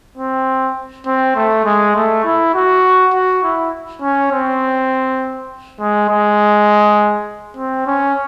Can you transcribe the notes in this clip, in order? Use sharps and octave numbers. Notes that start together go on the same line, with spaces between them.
C4
C4
A3
G#3
A3
E4
F#4
F#4
E4
C#4
C4
G#3
G#3
C4
C#4